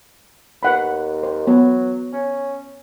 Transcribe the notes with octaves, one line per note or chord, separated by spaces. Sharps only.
D#2 B4 F#5 B5
C5
F#3 B3
C#4